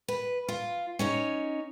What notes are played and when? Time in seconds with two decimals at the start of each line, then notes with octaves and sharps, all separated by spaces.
0.08 B4
0.48 F4
0.99 C#4 D#4 C#5